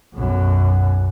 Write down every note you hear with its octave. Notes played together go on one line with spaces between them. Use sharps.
B1 F#2